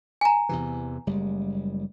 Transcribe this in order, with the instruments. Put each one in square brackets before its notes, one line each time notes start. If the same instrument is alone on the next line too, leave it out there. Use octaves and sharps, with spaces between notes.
[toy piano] G#5 A#5
[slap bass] E2 C3 E3
F#1 G3 G#3